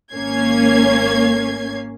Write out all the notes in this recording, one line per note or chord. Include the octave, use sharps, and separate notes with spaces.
G#1 A#3 C#4 G#6 C7